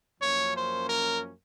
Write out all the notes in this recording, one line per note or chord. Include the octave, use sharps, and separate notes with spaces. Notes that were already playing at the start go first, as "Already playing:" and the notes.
F#2 F3 A#3 C#4 C#5
C5
A#4